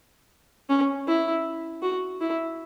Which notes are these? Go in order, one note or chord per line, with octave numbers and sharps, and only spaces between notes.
C#4
E4
F#4
E4